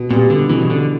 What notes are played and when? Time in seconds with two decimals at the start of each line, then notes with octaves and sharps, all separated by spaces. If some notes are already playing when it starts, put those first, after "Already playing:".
Already playing: B2
0.10 A#2 G3 B3
0.30 D3
0.49 B2 E3
0.61 C#3
0.70 D3